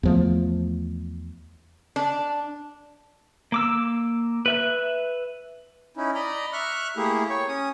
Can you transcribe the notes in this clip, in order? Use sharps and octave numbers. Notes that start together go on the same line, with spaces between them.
E2 F3 A3
D4
A#3 D6 E6
B4 E5 F#6
C#4 D#4 E4
D5 D#5 A#5 B5
E5 C#6 F6 F#6
A3 A#3 E4 G4 G#4
C#5 G5 C#6
C#4 D#6